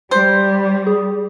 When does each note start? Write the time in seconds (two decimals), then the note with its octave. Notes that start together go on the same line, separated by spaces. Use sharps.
0.11 G3 C5
0.87 G#4